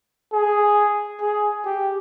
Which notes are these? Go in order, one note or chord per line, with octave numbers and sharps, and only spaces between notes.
G#4
G#4
G4